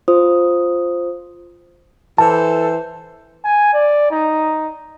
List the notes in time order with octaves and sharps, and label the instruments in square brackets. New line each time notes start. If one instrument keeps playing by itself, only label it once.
[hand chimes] F4 C5 D#6
[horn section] E3 C5 [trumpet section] A4 [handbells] A5
[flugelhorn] G#5
D5
D#4